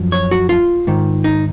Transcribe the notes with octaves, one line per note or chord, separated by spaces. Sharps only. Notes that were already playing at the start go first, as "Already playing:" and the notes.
Already playing: F#2 F3
C#5
F#4
F4
G#2 D#3
D#4